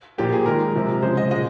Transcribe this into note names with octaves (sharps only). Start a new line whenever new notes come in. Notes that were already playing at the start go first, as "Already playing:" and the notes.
A#2 F3 A#3 G4
G#4
D#3 G#3 A#4
C3 F3 G#3
C#3 F3 G#3 C5
D#5
A#2 G#3 D#5